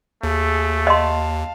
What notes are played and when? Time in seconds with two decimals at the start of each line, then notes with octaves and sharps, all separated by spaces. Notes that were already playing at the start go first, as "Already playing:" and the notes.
0.23 D#2 A3 G#4
0.87 D#5 F5 A5 C6